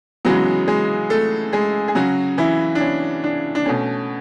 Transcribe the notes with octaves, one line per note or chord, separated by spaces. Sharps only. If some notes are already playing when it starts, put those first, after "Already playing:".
C#3 E3 F#3 G#3 B3 F#4
G#3 G#4
A3 A4
G#3 G#4
G#4
C#3 F#3 C#4 F#4
E3 E4
D4
C#4
D4
D4
B2 A3 C#4